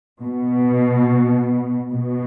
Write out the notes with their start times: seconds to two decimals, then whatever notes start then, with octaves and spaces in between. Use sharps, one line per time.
0.23 B2
1.93 B2